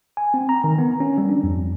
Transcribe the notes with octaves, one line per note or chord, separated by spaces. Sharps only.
G#5
C4
A#5
D#3
B3
C#4
G3
D4
F2